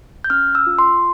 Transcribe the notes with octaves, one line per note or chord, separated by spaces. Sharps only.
G6
C#4 F6
E6
F4
C6